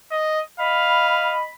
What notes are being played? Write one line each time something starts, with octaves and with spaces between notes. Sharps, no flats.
D#5
D#5 F5 B5